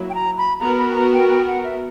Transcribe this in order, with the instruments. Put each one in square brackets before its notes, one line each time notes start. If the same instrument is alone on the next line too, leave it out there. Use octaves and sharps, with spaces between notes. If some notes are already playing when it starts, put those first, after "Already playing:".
Already playing: [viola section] F#3 A#3 E4
[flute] G5
A#5
B5
[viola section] B3 F#4 A#4 [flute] A#5
[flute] B5
G5
A#5
G5
G5
F#5
E5